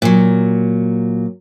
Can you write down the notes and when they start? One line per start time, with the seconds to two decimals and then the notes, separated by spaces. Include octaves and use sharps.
0.02 A#2 F#3